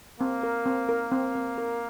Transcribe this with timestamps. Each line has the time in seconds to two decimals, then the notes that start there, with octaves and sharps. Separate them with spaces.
0.20 A#3 C4
0.43 A#4
0.66 C4
0.89 A#4
1.12 C4
1.35 C4
1.58 A#4